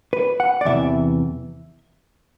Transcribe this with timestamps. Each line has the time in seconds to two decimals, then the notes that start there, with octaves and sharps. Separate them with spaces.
0.13 B4
0.40 F#5
0.61 D5
0.65 E2 C3 E3 E5